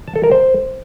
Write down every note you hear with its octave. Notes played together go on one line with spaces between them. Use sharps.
A5
A4
A#4
C5